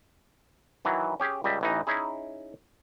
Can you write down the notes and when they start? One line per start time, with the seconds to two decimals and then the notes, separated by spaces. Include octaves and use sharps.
0.85 D#3 E3 F#3
1.20 C#4 G4 G#4
1.44 C#2 G3 D#5 E5
1.61 A1 E3 D#4
1.87 C#4 D#4 E4 G#4